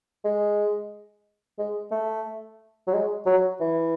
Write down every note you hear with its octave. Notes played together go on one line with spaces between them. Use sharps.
G#3
G#3
A3
F#3
G#3
F#3
E3